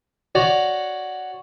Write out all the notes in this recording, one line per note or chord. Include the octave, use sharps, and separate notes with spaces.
F#4 C#5 D5 A#5